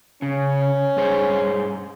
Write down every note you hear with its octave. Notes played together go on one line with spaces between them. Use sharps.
C#3 C#4
G2 G#4 C5